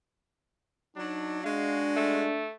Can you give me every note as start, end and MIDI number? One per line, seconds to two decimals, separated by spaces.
0.96 1.44 54
0.96 1.44 62
0.96 1.39 63
1.44 2.26 56
1.44 2.46 62
1.44 2.26 66
1.44 1.81 77
1.96 2.52 57